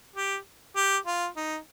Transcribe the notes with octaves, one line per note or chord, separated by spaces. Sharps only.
G4
G4
F4
D#4